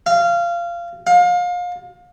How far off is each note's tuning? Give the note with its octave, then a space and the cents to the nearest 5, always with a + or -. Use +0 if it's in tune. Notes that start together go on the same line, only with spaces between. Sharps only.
F5 -20
F5 +30